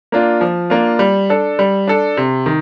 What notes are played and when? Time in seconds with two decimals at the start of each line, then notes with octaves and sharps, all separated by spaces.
0.12 A#3 D4 F4
0.41 F3
0.70 A#3 D4 F4
0.99 G3
1.30 D4 A4
1.59 G3
1.87 D4 A4
2.17 C3
2.46 D#3